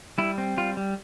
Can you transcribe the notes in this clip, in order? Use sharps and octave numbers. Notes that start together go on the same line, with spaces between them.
G3 E4
C4
G3 F4
G3